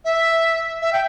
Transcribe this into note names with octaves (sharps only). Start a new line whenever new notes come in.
E5
E5
G5